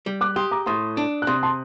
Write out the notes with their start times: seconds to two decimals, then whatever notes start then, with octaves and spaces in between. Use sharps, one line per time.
0.06 G3
0.21 D6 F#6
0.36 G4 C6 D#6
0.51 A#5 D6
0.66 A2 C6 D#6
0.97 D4
1.22 F#6
1.27 C3 C6 D#6
1.43 A5 C6